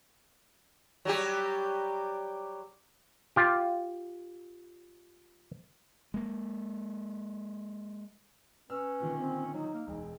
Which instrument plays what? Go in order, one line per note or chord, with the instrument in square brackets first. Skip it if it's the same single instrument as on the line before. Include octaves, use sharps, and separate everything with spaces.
[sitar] F#3 G3 G4
[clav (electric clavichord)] F4 G4
[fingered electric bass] G#3 A#3
[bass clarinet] C#4 [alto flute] B4 [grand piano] E6 F6
[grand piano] A#2 D3 D#3
[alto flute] C4
[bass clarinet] F#3 [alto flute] D#4
[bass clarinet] A#3
[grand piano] E1 [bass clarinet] G#3